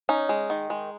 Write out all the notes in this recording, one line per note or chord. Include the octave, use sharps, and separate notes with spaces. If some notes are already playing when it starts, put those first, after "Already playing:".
C#4 D#4
G#3
D#3
G#3